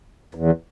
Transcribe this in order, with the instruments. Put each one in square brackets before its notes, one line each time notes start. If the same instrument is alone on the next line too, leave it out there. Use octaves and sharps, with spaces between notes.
[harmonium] E2